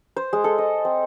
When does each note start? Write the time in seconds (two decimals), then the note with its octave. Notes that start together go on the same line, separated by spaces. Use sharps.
0.16 C5
0.33 G#3
0.44 A4
0.58 D#5
0.85 C4